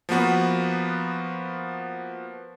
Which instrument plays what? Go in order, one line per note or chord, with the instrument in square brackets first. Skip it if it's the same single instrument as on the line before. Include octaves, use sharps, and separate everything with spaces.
[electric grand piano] F3 A#3 B3 F#4 B4